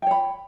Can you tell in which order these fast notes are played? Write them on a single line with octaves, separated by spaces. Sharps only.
G5 C#5 B5